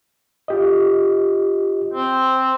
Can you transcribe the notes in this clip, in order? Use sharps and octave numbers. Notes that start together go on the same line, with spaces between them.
F4 G4 D#5
C4